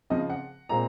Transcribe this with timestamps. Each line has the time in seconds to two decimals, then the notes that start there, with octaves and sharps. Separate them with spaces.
0.10 C#3 F3 C4 D#5
0.30 F#5
0.69 A#2 G#3 C4 A#5